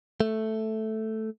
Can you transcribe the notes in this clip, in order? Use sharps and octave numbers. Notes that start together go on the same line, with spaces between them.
A3